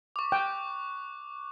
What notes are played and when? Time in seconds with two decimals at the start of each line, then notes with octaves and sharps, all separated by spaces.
0.16 C#6 D6
0.32 G5 F#6